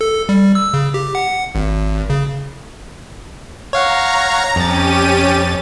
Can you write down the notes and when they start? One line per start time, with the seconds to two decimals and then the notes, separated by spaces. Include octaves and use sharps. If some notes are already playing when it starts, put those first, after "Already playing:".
0.01 A4
0.29 G3
0.55 E6
0.74 C#3
0.94 G4
1.15 F#5
1.55 G#1
2.10 C#3
3.73 C#5 F5 F#5 A#5
4.56 F2 C#4 G4 A6 D#7